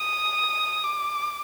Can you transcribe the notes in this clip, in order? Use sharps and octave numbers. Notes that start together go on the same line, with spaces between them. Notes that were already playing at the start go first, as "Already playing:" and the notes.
Already playing: D#6
D6